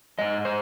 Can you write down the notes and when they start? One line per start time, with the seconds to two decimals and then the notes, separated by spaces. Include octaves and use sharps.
0.19 G#2 G#3 D#5
0.45 C5